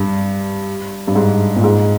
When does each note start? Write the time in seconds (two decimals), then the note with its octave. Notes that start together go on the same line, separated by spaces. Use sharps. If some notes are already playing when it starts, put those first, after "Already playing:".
Already playing: G2
1.08 G2
1.15 G#2
1.56 A#2
1.64 G#2